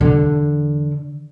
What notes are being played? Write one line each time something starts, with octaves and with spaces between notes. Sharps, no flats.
E2 D3